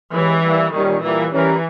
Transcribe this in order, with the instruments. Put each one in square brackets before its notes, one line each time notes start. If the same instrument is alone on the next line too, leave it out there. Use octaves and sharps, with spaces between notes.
[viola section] E3 [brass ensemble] G#3 C#4 G4 B4
[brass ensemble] G3 A#3 E4
[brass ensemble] A#2 G3 C#4 [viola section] D#3
[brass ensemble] A#2 G3 A#3 [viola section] E3
[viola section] E3 [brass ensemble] G3 C#4 G4 A#4